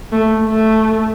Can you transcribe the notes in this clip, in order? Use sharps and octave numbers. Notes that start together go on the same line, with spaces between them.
A3
A3